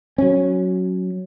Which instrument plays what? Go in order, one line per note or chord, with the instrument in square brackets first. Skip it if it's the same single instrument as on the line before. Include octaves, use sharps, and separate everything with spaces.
[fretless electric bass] F#3 C#4